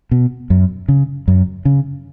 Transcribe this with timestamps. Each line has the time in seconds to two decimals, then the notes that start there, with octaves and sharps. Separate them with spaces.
0.11 B2
0.50 F#2
0.88 C#3
1.28 F#2
1.65 C#3